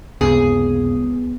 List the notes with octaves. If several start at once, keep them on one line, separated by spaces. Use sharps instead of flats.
C#2 F#2 C3 A#3 B3 G#4